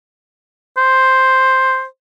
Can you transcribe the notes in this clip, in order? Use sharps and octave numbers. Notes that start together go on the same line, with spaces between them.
C5